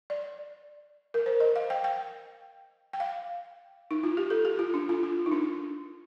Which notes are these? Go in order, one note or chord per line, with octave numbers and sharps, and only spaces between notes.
D5
A#4
C5
D#5
F5
G5
G5
G5
F5
D#4
F4
G4
A4
G4
F4
D4
F4
F4
D#4
D4